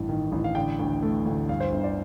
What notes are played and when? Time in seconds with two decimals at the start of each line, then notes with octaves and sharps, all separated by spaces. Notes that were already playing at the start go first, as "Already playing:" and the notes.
Already playing: A1 G2
0.09 D#3
0.32 A1
0.44 F5
0.55 D3 G5
0.79 D2
1.02 A3
1.26 D2
1.49 G2 F5
1.60 C5
1.72 G1
1.84 D5